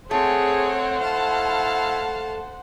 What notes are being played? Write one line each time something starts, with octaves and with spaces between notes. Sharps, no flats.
A3 C4 G#4 C5 C#5 F#5
E4 F5 A5